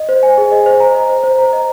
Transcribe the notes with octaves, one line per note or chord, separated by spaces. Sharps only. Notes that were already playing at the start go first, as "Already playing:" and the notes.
Already playing: D#5
C5
G#5
G#4
D#5
C5
A#5
D#5
C5
C5
A#5
D#5